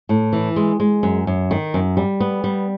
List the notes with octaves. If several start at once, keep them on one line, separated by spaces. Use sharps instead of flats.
A2
E3
G#3
G#3
F#2
F#2
D#3
F#2
G3
B3
G3